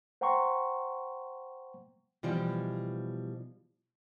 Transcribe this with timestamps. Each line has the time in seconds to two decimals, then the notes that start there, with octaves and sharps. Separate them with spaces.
0.21 C5 F#5 G5 A#5 C6 C#6
2.23 B2 E3 F3 G3